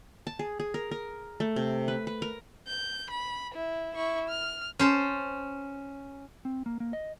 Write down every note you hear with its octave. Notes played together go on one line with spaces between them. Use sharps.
A5
G#4
G#4
A#4
A#4
A3
C3
B4
B4
A#4
G6
B5
E4
E4 C#6
F6
C#4 C5 A5
C4
A#3
A#3
D#5